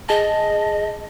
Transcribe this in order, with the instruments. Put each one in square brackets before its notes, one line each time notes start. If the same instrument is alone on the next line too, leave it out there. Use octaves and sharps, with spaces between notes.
[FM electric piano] G#4 A5 [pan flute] D#5